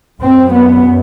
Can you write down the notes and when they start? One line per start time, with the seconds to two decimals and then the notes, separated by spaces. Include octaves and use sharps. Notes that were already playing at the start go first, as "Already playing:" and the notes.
0.21 F#2 C4
0.52 B3